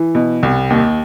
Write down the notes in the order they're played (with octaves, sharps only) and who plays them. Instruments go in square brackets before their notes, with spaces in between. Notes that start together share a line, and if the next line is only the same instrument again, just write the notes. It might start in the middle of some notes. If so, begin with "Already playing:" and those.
Already playing: [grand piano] E3
[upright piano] B2
C2
D#2